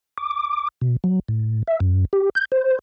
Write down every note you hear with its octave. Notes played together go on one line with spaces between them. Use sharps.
D6
B2
F#3
A2
E5
F#2
G4
G6
C5